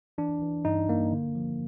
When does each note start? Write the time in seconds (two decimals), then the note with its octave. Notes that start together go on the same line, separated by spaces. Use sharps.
0.18 E3 D4
0.42 E3
0.65 G2 D#4
0.88 G2 A#3
1.12 D3
1.35 F3